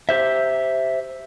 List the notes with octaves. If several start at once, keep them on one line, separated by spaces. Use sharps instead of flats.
G4 C5 E5